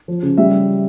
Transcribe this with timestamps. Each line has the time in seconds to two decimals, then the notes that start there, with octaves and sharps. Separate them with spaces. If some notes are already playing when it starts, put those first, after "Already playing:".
0.08 F3
0.23 C#3
0.37 G3 E5